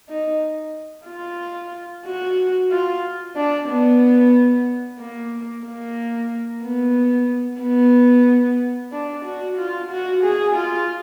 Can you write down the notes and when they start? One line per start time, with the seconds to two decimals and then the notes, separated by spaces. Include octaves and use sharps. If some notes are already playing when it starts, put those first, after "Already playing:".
0.09 D#4
1.07 F4
2.06 F#4
2.71 F4
3.36 D4
3.69 B3
5.00 A#3
5.65 A#3
6.64 B3
7.62 B3
8.93 D4
9.25 F#4
9.58 F4
9.91 F#4
10.24 G#4
10.56 F4